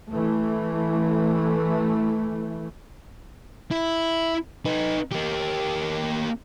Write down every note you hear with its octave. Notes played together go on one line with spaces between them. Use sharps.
E3 A3
E4
D#4 B4
A#3 G4